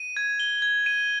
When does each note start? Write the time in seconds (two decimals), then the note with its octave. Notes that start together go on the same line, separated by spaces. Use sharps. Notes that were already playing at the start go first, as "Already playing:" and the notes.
Already playing: D#7
0.17 G#6
0.40 G7
0.62 G#6
0.86 D#7